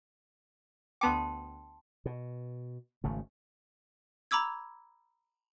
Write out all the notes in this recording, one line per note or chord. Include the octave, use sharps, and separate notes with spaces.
D2 B3 G5 A5 C6 D6
B2
G#1 C#3 A3
A#5 B5 D6 E6 G#6